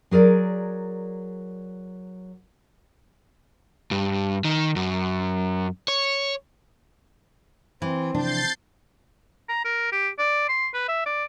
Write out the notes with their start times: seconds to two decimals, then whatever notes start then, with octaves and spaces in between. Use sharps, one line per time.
0.11 F#3 G#4 A#4 D5
3.91 G2
4.45 D#3
4.76 F#2
5.88 C#5
7.82 E3 C4
8.15 C3 E3 F3 D4 G6 A6 C7
9.49 A#5
9.65 A#4
9.92 G4
10.19 D5
10.49 C6
10.74 B4
10.88 E5
11.06 D5